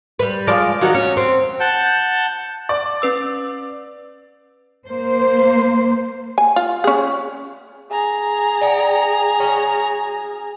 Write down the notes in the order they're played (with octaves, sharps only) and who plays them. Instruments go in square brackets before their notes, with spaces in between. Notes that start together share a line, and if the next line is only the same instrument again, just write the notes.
[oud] G3 B4
F3 G#3 D5
D#3 F#3 F#4
C#4
C4
[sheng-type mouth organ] F#5 A5 G6
[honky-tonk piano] D5
[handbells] C#4 B4 E6
[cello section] A#3 C5
[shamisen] G#5
F4
C#4 G#4
[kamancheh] G#4 A#5
[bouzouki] D5 F#5 G5
F#3 C#4